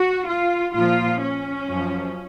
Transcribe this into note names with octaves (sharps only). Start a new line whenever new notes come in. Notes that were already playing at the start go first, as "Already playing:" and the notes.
Already playing: F#4
F4
A#2 F3 F4
C#4
F#2 F3